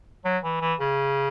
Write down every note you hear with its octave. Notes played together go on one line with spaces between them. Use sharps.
F#3
E3
E3
C#3